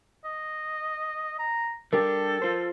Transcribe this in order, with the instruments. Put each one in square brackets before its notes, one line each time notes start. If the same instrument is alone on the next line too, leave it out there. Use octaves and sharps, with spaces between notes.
[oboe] D#5
A#5
[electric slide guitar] G3 D4 G4 [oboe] A4 [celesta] A#4
[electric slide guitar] F4 C5